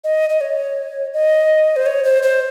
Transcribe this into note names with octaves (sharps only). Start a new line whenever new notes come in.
D#5
D#5
C#5
D#5
C5
C#5
C5
C5